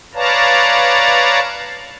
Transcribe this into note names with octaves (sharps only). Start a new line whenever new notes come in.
B4 C#5 D5 F5 A5 A#5